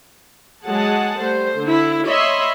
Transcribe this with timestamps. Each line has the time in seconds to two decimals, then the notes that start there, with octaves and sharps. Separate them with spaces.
0.65 F#3 G#3 G#4 F#5 A5
1.20 G3 A3 C5
1.61 D3 E4
2.06 C#5 D#5 E5 B5 C6